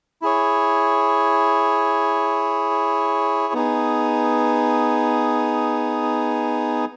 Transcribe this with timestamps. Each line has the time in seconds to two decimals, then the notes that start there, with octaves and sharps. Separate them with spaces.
0.22 E4 G#4 C#5
3.54 B3 D#4 G#4